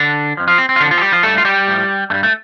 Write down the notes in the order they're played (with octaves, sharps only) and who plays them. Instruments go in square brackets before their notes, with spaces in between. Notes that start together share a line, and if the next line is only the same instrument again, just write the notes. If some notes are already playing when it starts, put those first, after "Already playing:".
Already playing: [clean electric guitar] D3 D4
F3
F2
F3 F4
C4
C4
F4
F2 D3 F3 D4
F3 F4
A4
G3 G4
F3 F4
G2 G3 A3 A4
F4
G3 G4
A2 F3
G2 G3 A3
A3